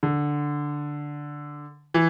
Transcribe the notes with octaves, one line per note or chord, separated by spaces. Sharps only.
D3
E3